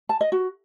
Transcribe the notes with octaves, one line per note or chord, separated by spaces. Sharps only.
A5
D#5
F#4